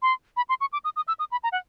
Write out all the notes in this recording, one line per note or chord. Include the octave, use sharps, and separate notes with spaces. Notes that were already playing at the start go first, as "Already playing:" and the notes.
C6
B5
C6
C#6
D6
D#6
D#6
E6
D#6
B5
A#5
F#5